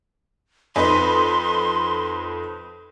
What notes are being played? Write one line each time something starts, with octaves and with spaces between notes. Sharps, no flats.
F2 D#4 B4 C6